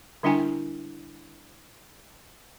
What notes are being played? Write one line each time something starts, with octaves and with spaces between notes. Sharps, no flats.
D3 G3 D4 E4 G5 G#5